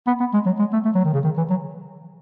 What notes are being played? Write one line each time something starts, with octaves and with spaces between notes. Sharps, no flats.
B3
B3
G#3
F#3
G#3
A3
A3
F#3
D#3
C#3
D#3
E3
F#3